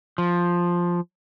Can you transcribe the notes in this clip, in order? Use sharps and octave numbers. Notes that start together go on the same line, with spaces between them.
F3